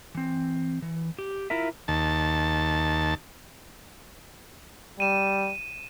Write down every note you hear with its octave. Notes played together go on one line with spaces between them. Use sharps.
E3 C4
E3
G4
E4 F4 A#4 E5
D#2 A5
G3 D#7 E7